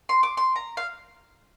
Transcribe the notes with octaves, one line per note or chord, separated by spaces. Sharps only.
C6
D6
C6
A#5
F5